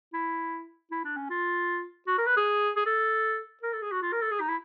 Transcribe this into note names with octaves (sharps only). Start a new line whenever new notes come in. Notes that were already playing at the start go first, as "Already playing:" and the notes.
E4
E4
D4
C#4
F4
F#4
A#4
B4
G#4
G#4
A4
A#4
A4
G#4
F#4
F4
A#4
A4
G#4
D#4
E4